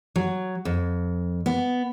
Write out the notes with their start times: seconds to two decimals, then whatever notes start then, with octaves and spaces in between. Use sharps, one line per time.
0.16 F#3
0.65 F2
1.46 B3